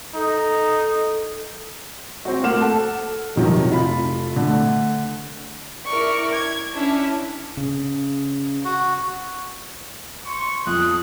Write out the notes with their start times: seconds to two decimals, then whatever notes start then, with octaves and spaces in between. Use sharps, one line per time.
0.15 D#4 A4
2.25 C4 F#4
2.43 A3 A#3 F#5 D6 F6 E7
2.61 A4 F#5 A5
3.36 F2 C3 D#3 F3 F#3
3.70 F1 F4 B5
4.36 D3 A3
5.85 E4 A#4 D5 C#6
6.31 G#6
6.74 C#4 D4 E4
7.57 C#3
8.65 F#4
10.26 C6 C#6
10.67 F2 D#6 F#6